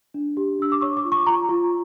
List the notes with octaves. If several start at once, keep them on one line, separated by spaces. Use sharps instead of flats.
D4
G4
D4 E6
D6
C#5 C#6
D6
F4
C#6
F4 A#5
F4